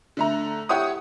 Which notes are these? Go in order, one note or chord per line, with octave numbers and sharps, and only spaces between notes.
D3 A3 A#5
E4 G4 C#5 F#5 D#6